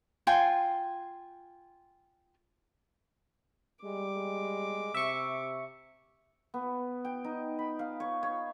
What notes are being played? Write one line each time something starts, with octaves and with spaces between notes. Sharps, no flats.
F4 G5 G#5 C6
G3 G#3 D6
G#3
C3 E5 C#6
B3
G5
D#4
B5
F5
C#5
C#5